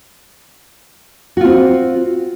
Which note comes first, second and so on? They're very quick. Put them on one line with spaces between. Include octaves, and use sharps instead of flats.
F#4 F4 C4